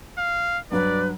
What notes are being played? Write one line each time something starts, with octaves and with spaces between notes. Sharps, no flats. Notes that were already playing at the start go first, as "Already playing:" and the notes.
F5
G2 F#3 B4 D5